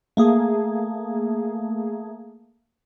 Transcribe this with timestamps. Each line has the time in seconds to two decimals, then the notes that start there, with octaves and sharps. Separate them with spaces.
0.17 A3 A#3 G#4